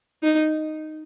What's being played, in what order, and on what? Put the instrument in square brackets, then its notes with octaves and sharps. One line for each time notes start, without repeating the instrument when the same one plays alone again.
[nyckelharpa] D#4